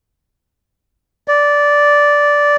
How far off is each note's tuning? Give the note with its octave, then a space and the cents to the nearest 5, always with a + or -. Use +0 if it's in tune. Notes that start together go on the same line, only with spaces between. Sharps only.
D5 -10